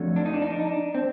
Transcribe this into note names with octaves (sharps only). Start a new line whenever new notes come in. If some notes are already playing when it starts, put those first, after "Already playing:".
Already playing: F2 D3 F#3 A3
D4
D#4
D4
D#4
D4
D#4
D4
C4